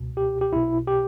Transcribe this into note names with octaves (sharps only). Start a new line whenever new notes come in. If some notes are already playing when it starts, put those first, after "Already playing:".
Already playing: C#2 B2
G4
G4
B1 B2 E4
G4